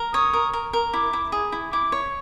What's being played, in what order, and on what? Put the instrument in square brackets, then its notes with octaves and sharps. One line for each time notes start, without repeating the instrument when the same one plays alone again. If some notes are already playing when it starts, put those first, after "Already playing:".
Already playing: [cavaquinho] A#4
[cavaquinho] C#5 [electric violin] D#6
[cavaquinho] A#4
A#4
A#4
[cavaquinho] E4 [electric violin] D6
[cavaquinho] E4
G#4
E4
[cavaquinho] E4 [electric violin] D6
[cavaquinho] C#5